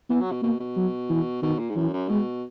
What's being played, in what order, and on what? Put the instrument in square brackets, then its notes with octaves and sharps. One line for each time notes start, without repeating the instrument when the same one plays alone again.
[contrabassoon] E3 [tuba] B3
[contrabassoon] F#3
B2
[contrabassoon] B2 [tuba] A#3
[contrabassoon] B2
[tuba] F#3
E3
[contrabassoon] B2 [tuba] D#3
[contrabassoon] A#2
G#2
[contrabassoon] F#2 [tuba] E3
[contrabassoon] F#2
[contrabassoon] B2 [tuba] G#3